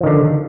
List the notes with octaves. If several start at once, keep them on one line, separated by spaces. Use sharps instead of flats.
D3 D#3 F3